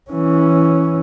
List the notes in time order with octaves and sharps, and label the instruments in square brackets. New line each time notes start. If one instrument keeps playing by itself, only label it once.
[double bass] E3 C#4